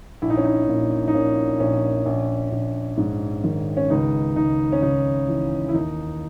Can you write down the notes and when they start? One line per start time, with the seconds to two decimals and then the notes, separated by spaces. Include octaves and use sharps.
0.22 A#1 E4
0.30 D#4
0.37 C#4
0.45 D#4
0.68 A#2
1.08 D#4
1.14 A#2 C#4
1.60 A#1 C#4
2.06 A#1
2.52 A#1
2.97 G#2
3.44 D#3
3.77 C#4
3.90 C#2 D#4
4.36 C#2 D#4
4.72 C#4
4.82 C#3 D#4
5.28 E3
5.69 E4
5.74 D#2 D#4